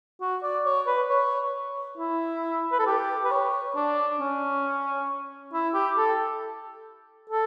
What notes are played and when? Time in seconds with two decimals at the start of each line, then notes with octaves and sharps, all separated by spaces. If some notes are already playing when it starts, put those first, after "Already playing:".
0.21 F#4
0.43 D5
0.66 C#5
0.87 B4
1.09 C#5
1.98 E4
2.72 B4
2.79 A4
2.86 G4
3.25 B4
3.31 C#5
3.75 D4
4.20 C#4
5.53 E4
5.74 G4
5.97 A4
7.30 A4